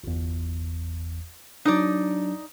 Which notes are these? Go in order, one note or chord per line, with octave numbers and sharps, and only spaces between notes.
G1 E2
F#3 D4 D#4 D5